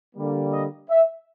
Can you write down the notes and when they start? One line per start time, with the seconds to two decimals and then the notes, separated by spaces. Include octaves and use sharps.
0.14 D3 G3 A#3
0.52 D#5
0.90 E5